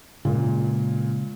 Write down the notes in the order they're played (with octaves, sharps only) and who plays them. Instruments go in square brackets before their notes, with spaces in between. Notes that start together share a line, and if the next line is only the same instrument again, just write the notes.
[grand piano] A#2 [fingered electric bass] C#3 G#3 A#3